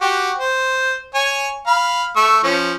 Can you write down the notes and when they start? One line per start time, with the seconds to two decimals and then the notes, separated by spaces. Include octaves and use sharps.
0.01 F#4 G4
0.38 C5
1.15 C#5 G#5
1.67 F5 B5
2.16 A3 C#6 E6
2.43 F3 C#4